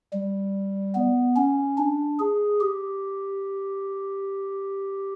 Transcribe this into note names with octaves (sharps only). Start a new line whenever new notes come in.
G3
B3
C#4
D4
G#4
G4